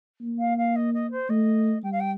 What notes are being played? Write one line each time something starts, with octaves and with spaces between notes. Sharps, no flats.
A#3
F5
F5
D#5
D#5
C5
A3 D#5
G3 G5
F5
G5